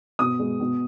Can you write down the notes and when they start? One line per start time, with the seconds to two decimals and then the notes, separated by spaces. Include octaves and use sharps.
0.19 B2 D#6
0.39 G#3
0.60 B2